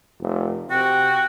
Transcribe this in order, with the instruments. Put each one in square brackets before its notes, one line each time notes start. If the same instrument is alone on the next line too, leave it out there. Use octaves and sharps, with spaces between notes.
[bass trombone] F1
[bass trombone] C3 [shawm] F#4 [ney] G5